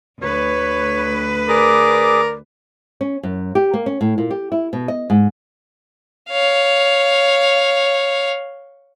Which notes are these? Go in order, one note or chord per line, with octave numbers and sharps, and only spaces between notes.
D2 B4 C#5
G#4 A#4 D5 D6
C#4
F#2
G4
A#3
C#4
A2
A#2
G4
E4
B2
D#5
G#2
C#5 F5